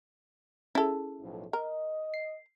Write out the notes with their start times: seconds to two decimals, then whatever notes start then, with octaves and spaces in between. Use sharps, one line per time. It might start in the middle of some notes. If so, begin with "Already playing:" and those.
0.75 C#4 E4 G#4 A4
1.21 B1 A2 F3
1.53 A#4 D#5
2.14 C7